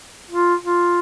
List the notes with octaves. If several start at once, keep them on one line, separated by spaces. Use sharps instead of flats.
F4
F4